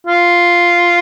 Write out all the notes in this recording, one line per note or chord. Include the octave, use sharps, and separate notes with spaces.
F4